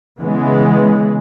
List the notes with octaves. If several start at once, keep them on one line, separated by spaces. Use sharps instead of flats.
C#3 E3 G#3 B3